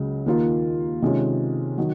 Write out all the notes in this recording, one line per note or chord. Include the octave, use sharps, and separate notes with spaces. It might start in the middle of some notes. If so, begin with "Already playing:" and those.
Already playing: C#2 C#3 F#3
D#2 D#3 A#3 F4
C3 D#3 G#3 C#4 F4
D#3 F#3